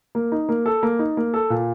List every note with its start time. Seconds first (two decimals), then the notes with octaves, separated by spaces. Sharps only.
0.15 A#3
0.32 D#4
0.49 A#3
0.66 A4
0.83 A#3
0.99 D#4
1.17 A#3
1.34 A4
1.50 A#2